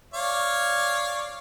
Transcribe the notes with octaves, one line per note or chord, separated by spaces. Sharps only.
C#5 D5 F5